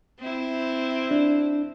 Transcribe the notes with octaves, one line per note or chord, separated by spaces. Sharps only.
C4 E4
D4